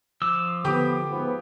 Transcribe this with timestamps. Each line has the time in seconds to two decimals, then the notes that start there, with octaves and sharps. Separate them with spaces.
0.22 F3 D6 E6
0.65 D3 B3 G4 D6 D#6
1.08 G#2 F3 B3